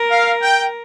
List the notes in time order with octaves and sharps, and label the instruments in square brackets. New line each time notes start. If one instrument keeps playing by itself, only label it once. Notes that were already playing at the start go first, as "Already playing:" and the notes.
Already playing: [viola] A#4
[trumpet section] F5
G5